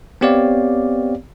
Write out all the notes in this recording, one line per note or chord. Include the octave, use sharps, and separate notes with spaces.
B3 C4 G4 C#5 D5 F5